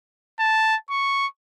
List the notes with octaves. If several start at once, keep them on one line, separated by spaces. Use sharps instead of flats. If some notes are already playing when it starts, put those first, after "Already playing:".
A5
C#6